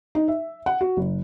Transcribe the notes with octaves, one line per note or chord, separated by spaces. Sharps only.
D#4
E5
F#5
F#4
F#1